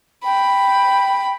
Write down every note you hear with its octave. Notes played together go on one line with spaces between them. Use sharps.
G5 B5